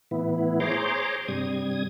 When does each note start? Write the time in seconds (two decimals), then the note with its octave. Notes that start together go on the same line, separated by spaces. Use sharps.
0.11 A2 E3 B3 E4
0.60 G#4 C5 C#5 A#5 C6 D6
1.28 G2 C3 G3 D#6 G#6